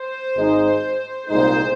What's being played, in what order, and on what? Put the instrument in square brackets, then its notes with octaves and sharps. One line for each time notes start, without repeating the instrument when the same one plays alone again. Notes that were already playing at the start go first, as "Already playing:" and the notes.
Already playing: [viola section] C5
[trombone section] G#1 G#2 G#3 D#4
[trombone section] C2 A#2 G#3 D#4 [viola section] C5